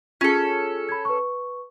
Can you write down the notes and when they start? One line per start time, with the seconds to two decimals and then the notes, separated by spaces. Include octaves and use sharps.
0.21 C#4 F4 G#4 A4
0.89 B5 G#6
1.05 B4 C#6